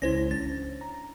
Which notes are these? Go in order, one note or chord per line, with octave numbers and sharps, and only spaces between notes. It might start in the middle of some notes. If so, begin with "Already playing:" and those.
C#2 C#4 E4 C5 A#6
D4 A6
A#5